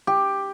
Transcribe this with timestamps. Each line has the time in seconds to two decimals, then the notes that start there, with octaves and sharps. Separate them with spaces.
0.07 G4